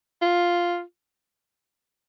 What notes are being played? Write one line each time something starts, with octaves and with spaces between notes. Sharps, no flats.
F4